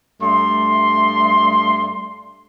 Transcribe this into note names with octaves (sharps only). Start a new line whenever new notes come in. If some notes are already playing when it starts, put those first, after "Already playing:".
G2 A3 C6